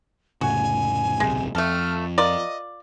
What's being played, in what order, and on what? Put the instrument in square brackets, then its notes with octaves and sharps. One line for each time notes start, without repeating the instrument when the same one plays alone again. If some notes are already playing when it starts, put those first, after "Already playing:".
[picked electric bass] F1 A2 C#3 [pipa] F#4 [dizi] G#5
[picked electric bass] D1 B1 C3 [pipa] G#3
[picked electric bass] F2 [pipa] A3 A4 [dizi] F6
[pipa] F4 A#4 D5 [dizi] D#5